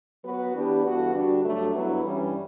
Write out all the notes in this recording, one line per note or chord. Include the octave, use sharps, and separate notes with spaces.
F#3 B3 F#4 B4
E3 B3 D4 G4 B4
G2 E3 B3 F#4 A4
D3 G3 D4 F#4
G2 F#3 A3 D4 A4
G2 F#3 B3 E4 B4
G2 E3 G3 C#4